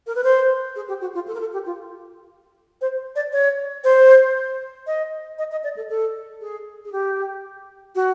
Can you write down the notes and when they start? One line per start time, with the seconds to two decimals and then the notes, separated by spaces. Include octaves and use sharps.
0.07 A#4
0.15 B4
0.24 C5
0.76 G#4
0.88 G4
1.01 F#4
1.15 F4
1.27 A4
1.35 A#4
1.40 A4
1.53 G4
1.66 F4
2.81 C5
3.16 D5
3.33 C#5
3.84 C5
4.87 D#5
5.38 D#5
5.51 D#5
5.64 D5
5.77 A4
5.89 A4
6.41 G#4
6.85 G#4
6.92 G4
7.95 F#4